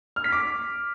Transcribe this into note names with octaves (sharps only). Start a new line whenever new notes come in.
F6
B6
D6